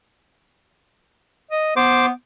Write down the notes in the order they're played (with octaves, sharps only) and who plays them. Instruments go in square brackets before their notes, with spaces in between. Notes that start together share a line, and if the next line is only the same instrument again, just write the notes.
[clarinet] D#5
[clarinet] B3 [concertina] C5 D6